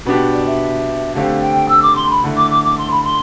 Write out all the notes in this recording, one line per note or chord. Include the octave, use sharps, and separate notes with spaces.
B2 B3 D4 G4
D5
E5
D3 A3 C4 G4 F5
G5
E6
D6
C6
B5
D3 A3 E4
D6
D6
D6
C6
B5
C6